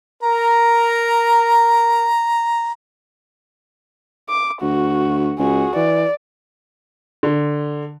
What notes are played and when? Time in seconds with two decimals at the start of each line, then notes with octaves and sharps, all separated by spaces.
0.23 A#4 A#5
4.29 D6
4.62 D2 F#4
5.39 C#2 F#4 G#4
5.76 E3 D5
7.23 D3